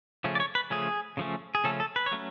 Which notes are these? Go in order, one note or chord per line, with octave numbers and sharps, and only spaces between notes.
C#3 F3 A3 C#4
D5
C#5
B4
C#3 F3 A3 C#4 G#4
C#3 F3 A3 C#4
G#4
C#3 F3 A3 C#4 A4
A4
B4
C#5
F#3 A3 C#4